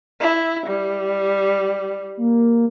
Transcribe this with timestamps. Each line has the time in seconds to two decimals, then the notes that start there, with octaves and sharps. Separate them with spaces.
0.21 E4
0.67 G3
2.17 A#3